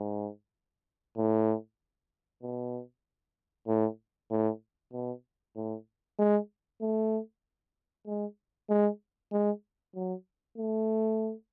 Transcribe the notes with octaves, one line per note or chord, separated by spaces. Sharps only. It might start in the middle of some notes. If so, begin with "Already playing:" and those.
Already playing: G#2
A2
B2
A2
A2
B2
A2
G#3
A3
G#3
G#3
G#3
F#3
A3